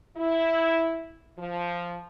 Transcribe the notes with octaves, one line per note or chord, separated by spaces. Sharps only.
E4
F3